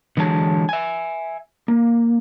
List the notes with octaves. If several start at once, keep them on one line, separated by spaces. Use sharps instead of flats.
D3 E3 F#3 G#3 G#5 A5
E5 G#5
A#3